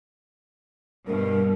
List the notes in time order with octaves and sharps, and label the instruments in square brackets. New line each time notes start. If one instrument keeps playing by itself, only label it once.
[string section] G2 B2 [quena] A#4